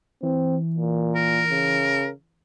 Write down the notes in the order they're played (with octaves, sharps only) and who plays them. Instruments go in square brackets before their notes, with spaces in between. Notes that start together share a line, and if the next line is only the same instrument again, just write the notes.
[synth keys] E3 [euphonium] C4
[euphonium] A#2
[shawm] A#4
[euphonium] C#3